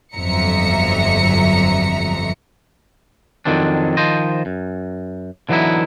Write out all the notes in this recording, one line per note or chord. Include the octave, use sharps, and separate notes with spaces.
G1 F2 F#3 E5 A#5 C#7
F2 B2 D#3 F#3 C4 D4
D#3 F3 C5 D#5
F#2
D3 E3 F#3 B3 D#4 E4